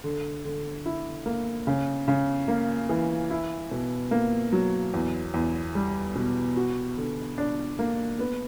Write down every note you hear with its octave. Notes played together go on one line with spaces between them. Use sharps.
D3
D3
E4
A#3
C#3
C#3
A#3
E3
E4
B2
A#3
F#3
E2
E2
G3
B2
F#4
D3
D4
A#3
B3